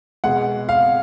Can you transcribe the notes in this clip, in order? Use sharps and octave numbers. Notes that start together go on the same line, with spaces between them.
B2 G#3 F#5
F5